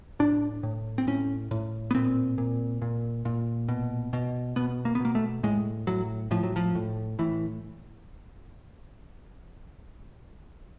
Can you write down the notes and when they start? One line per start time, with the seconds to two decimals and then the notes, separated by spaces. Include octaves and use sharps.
0.19 A2 D4
0.63 A2
0.98 C4
1.07 A2 C#4
1.51 A2
1.91 B3
1.94 A#2 C4
2.38 A#2
2.82 A#2
3.25 A#2
3.69 B2
4.13 B2
4.56 B2 B3
4.85 A#3
4.95 B3
5.00 B2 A#3
5.15 A3
5.43 A2 G#3
5.87 A2 F#3
6.31 A2 F3
6.43 F#3
6.56 F3
6.75 A2
7.19 A2 E3